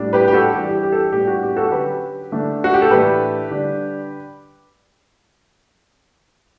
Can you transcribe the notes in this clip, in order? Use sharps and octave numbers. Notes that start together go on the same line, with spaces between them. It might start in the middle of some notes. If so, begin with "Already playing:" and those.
Already playing: A2 G3 D4
G4 B4
G4
F#4 A4
E3 G3 D4 G4
G4
G4
A4
G4
A2 G3 B3 D4 G4
F#4
G4
F#4 A4
D3 F#3 C#4 G4 B4
D3 A3 D4
F#4
G4
A4
A2 E3 A3 D4 G4 B4
D3 G3 D4